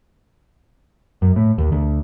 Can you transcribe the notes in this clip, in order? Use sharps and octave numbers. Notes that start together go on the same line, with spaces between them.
F#2
A2
D#2
D2